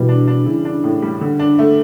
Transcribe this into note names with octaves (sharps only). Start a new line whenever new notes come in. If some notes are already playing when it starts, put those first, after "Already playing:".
Already playing: B2 E3 G3
D4
D4
C#3 E3
D4
A2
G3
D3
D4
A3